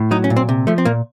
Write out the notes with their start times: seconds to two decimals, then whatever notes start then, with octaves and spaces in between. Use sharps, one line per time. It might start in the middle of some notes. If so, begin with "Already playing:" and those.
Already playing: A2
0.11 F#3 D#4
0.24 C#4
0.30 A#2
0.37 C4
0.49 C3
0.67 F3 A3
0.78 C4
0.85 A#2 A#3